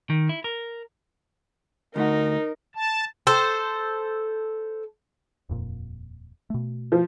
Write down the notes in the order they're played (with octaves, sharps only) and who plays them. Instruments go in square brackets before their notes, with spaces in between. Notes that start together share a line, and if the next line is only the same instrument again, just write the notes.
[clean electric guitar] D#3
E4
A#4
[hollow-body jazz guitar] D2 A3 F#5 [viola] D#4 [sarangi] A#4
[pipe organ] A5
[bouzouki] A4 C5
[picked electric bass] D#1 F2 A#2
B2 A3
[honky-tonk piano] F3